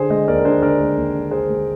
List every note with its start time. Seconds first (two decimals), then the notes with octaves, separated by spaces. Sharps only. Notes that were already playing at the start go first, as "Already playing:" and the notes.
Already playing: D3 G#4 C5
0.10 G#3 C5 D#5
0.28 D#2 A#4 D5
0.39 A#4
0.45 D4 G#4 C5
0.62 D3 A#4 D5
0.80 G#3
0.97 D#2
1.15 D4
1.31 D3 G#4 C5
1.49 G#3